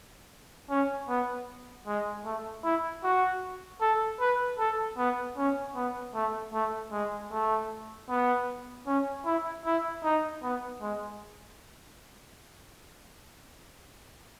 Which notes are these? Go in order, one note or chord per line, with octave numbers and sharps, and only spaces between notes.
C#4
B3
G#3
A3
E4
F#4
A4
B4
A4
B3
C#4
B3
A3
A3
G#3
A3
B3
C#4
E4
E4
D#4
B3
G#3